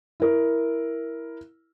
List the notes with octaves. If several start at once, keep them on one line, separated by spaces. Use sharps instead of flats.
E4 A#4